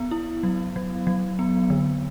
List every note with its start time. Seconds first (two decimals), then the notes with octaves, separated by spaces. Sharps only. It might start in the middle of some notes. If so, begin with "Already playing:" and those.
Already playing: B3
0.11 E4
0.43 F#3
0.76 F#3
1.07 F#3
1.39 B3
1.70 D3